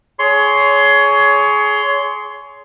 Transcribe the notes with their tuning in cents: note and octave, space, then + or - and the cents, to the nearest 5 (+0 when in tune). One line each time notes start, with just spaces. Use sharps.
G#4 +20 C#5 +20 C6 +0